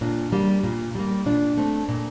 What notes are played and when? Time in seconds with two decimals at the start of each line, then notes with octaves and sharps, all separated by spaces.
0.01 A#2 D4
0.32 G3 A#3
0.63 A#2
0.95 G3 A#3
1.26 A#2 D4
1.57 A3 C4
1.89 A#2